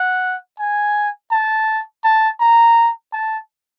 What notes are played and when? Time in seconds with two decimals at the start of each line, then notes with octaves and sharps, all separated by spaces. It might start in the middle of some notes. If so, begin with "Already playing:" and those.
Already playing: F#5
0.59 G#5
1.31 A5
2.04 A5
2.40 A#5
3.13 A5